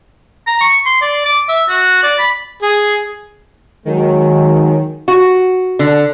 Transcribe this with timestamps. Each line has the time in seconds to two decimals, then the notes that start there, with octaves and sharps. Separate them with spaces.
0.47 A#5
0.61 C#6
0.86 C6
1.02 D5
1.25 D6
1.49 E5
1.69 F#4
2.03 D5
2.19 B5
2.62 G#4
3.85 D#3 F#3 G#3
5.08 F#4
5.79 D3